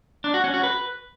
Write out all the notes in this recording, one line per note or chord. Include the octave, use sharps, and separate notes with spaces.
D4
F#4
C#4
F#4
B4